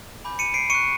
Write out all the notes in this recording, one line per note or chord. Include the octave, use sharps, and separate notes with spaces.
G#5 B5 D6 G6
C#7 D#7
C7 D7
C#6 F#6 C#7 D#7